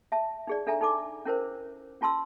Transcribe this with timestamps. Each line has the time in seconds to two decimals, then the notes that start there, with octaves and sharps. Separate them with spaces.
0.12 E5 A5
0.47 D#4 G#4 D5
0.67 D4 A4 E5 G#5 A#5
0.81 D#4 A4 D6
1.25 C#4 E4 A#4 C5
2.01 C#4 F4 A5 C6 E6